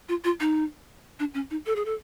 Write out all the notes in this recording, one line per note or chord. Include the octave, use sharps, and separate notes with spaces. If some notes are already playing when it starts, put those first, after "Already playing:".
F4
F4
D#4
D4
C#4
D#4
A4
G#4
A4